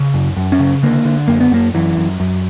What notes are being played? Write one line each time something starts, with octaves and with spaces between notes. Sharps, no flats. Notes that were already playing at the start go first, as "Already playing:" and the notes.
Already playing: C#3
F#2
F#2
C#4
C#3
D3 A#3
D3
F#2 A#3
B3
F#2 A#3
F#2 E3
F#2
F#2